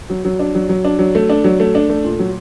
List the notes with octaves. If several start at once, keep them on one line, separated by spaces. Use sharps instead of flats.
F#3
F#3
D4
F#3
F#3
D4
F#3
A3
D4
F#3
A3
D4
A3
A#2
F#3